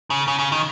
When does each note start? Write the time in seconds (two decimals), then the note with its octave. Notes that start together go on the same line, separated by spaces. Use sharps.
0.10 C#3
0.28 C#3
0.39 C#3
0.52 D#3